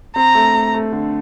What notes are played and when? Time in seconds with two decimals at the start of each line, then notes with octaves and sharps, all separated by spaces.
0.16 C4 A#5
0.35 A3
0.55 A3
0.74 A3
0.92 D3